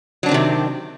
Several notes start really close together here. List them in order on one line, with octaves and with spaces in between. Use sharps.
F#3 D4 C4 D#3 C3